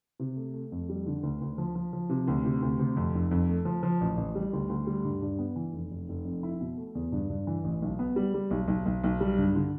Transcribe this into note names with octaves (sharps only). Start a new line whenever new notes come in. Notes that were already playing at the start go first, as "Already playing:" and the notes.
C3
A3
A3
F2
G3
D3
D2
D2
F3
F3
F3
C3
D2
C3
D2
C3
F2
F1
F2
A3
F3
F3
A1
A1
G3
D2
D2
G3
G2
G2
B3
E3
F1
F1
F1
F2
E4
B2
A3
E2
G2
G2
E3
A1
B1
B3
G3
G3
B1
B1
B1
B1
G3
G2
D3